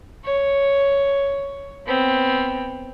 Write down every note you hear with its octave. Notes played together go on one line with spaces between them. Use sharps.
C#5
B3 C4